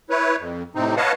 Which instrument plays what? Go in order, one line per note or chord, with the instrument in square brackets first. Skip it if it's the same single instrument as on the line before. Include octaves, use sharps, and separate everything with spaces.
[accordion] E4 B4 C#5
F2
A2 C3 C4 D#4
B4 C#5 D#5 F5 F#5 A5